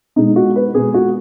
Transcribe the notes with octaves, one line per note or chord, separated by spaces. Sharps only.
B2 G#3 D#4
F#4
B4
B2 G#3 G#4
F#4